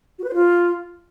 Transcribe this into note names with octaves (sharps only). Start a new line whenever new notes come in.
F#4
B4
C5
F4